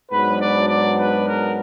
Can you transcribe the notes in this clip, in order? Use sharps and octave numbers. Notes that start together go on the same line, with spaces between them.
G#2 F#3 B3 D4 B4
D5
D5
B4
A#4